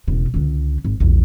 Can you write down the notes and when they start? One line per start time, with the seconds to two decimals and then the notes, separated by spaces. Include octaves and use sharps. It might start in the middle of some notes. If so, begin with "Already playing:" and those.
0.07 E1 C#3
0.34 C#2 D3
0.85 G#1
1.00 A#1 E2